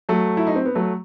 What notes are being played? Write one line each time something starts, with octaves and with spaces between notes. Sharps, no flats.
F#3 A3
E4
D#4
C4
B3
F#3 A3